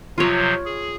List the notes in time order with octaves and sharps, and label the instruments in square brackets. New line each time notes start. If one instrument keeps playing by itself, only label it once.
[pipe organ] C3 F3 F#3 [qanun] F4 C#5
[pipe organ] G#4